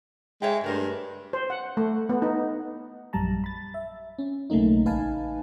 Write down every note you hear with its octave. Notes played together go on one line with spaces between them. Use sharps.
G#3 C#5 E5 G5
G2 A3 A#4 C5
C5
F#5
A3
B3
D#4
A#1 F#2 G3 A5 A#5
B5 A6
E5
C#4
B1 C#3 A3 A#3 D#4
A1 D#4 B4 F5 G#5 A5